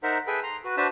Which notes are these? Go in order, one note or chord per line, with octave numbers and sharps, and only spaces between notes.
D#4 A#4 C5 E5 F#5
G#4 A4 B4 E5 G5 B5
A#5 C6
F#4 B4
D4 F#4 B4 C5 E5 A5